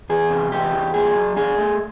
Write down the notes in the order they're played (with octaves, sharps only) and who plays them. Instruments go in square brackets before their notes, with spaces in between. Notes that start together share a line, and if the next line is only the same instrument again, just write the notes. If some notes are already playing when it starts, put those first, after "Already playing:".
[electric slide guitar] E2 G#4
C3
E2 G4
E3
A#2 G#4
F#3
D4 G#4
A3